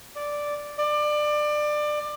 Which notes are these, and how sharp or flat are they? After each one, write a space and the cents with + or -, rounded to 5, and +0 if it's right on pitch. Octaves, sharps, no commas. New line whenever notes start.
D5 -5
D5 +25